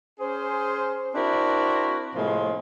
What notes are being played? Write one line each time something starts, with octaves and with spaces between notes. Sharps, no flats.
C#4 G#4 C5
C4 D4 E4 F#4 A#4
A2 C3 F3 G#3 A#3